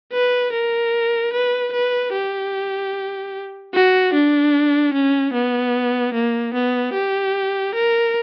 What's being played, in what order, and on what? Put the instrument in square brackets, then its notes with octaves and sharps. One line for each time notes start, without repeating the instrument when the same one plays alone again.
[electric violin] B4
A#4
B4
B4
G4
F#4
D4
C#4
B3
A#3
B3
G4
A#4